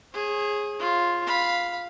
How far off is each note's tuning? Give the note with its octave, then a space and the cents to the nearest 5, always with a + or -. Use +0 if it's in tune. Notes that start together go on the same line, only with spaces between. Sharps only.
G#4 +0 C#5 -40
F4 +0 C#5 -35
F5 +0 B5 +0